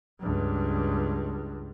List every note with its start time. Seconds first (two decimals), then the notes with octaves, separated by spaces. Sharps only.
0.19 C#2 G2